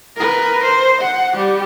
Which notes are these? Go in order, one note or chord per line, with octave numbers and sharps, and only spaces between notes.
A#4 B4
C5
F#5
G3 G4